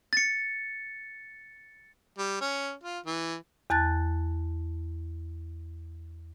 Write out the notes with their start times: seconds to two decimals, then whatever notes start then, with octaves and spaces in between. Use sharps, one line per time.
0.13 A6 C#7
2.18 G3
2.41 C#4
2.84 F4
3.06 E3
3.70 E2 A5 F#6 A6